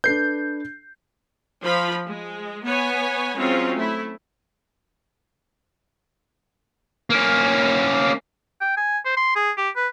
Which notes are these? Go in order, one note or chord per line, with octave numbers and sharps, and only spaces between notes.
D4 A4 B4 G6 C7
F3 F4 B5
G#3
B3 B4 C#5 G#5
F#3 G#3 C4 C#4 F4
A3 E4
A#3 C#4
G5
G#5
C5
C6
G#4
G4
B4